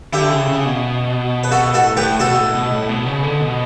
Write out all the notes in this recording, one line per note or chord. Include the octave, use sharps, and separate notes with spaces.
D3 E4 G4
C#3
C#3
B2
B4
B2 F#4 A4
A2 F#4 A4
A2 G4 B4
B2 F#4 A4
B2
A2
B2
A2
B2
C#3
D3
B2